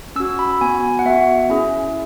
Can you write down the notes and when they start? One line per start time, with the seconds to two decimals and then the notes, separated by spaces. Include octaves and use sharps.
0.16 C#4 F#4 E6
0.39 B5
0.61 B3 F#4 G#5
0.99 F#5
1.05 B3 F#4 E5
1.49 C#4 E4 G#4